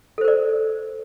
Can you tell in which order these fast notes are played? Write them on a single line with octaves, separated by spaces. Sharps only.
A4 C5 A#4 D5